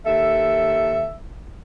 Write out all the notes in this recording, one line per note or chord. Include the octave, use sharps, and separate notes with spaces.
D#2 A4 E5